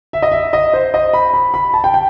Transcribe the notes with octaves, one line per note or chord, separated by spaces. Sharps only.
E5
D#5
E5
D#5
C5
D#5
B5
B5
B5
A5
G5
G5